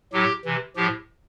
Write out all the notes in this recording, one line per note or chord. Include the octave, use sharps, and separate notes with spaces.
A2 F#3 G4
C3 E3
A2 F3 G4